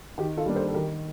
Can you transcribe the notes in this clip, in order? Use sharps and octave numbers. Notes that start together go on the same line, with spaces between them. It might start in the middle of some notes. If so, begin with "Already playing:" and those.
D#3 D#4 G4
F4 A4
G3 A#3 D4
A4 C5
A4
D#3 G4 A#4